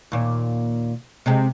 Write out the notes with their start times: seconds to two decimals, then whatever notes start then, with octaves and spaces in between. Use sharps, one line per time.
0.12 D#2 A#2
1.26 C3 G#3 C4